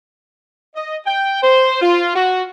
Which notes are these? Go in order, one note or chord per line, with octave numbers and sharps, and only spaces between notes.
D#5
G5
C5
F4
F#4